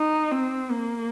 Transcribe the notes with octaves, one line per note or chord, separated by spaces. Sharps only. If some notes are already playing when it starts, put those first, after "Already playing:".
Already playing: D#4
C4
A#3